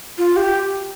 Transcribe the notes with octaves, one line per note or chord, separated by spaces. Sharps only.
F4
G4